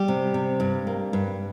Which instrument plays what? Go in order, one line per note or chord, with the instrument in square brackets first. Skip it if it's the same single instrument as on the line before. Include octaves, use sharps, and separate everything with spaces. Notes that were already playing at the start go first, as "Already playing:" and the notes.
Already playing: [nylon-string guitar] G3 G4
C3
C3
G2
A#3
G2